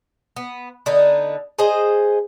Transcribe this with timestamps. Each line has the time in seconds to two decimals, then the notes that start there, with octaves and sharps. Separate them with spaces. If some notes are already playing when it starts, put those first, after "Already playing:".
0.36 B3
0.86 D3 B3 D#4
1.59 G#4 C5 D#5